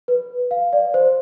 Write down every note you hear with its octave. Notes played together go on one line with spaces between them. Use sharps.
B4
F5
D5
C5